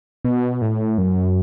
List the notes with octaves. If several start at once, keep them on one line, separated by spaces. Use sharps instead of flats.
B2
A2
F#2